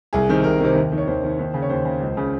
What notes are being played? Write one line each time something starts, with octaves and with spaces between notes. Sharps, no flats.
C2 G#4
C3 D#3
C2 A#4
C3 D#3
D#2
D#3
C#5
D#2 C5
D#3
D#2
C#3
C#5
D#2 C5
C#3
C#2
C#3